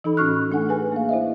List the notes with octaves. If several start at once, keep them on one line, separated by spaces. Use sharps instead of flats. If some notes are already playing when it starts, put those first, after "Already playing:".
E3 D#4 A4 B5
A2 C#4 F#4 C#6 F6 F#6
A3 D4 A4 F#5 G#5
G#4 B4 G#5
A#3 F5
E4 C5 D#5 E5